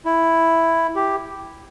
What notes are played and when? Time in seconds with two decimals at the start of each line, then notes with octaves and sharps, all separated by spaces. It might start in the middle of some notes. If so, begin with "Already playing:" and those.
0.05 E4
0.95 G4